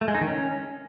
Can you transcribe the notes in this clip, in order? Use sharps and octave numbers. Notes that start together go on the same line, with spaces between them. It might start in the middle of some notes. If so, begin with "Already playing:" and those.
A3
G#3
D#4
D#3
C#4